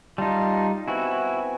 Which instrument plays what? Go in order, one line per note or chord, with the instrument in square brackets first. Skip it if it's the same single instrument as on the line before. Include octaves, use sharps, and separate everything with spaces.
[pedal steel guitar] G3 D#4 [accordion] F4 A5 C6
[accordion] B3 C4 G#5 [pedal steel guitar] E4 F#4